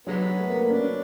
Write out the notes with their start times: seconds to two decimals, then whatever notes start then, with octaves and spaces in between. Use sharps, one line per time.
0.07 D3 F#3 G#3 B3
0.39 A3
0.49 A#3
0.70 C#4 D4